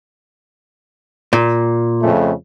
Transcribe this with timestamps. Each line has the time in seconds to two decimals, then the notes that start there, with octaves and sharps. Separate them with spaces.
1.33 A#2
2.02 F2 C#3 A3